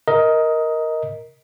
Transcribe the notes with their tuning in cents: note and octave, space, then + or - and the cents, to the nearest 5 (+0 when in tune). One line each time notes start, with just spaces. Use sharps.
A#4 +0 D#5 +15